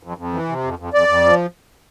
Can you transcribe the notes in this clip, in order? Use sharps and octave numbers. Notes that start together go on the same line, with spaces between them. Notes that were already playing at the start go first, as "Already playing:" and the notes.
F2
F2
E3
C3
F2
F2
F2 D5
F2
F3